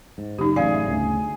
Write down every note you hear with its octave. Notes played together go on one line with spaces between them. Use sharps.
G#2
F#1 D#4 G4
A1 F#2 G#4 D5 F5
E5
G1 D2 C#3